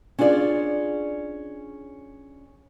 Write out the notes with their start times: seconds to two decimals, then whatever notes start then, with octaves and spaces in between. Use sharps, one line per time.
0.19 C#4 D4 F4 G#4 D5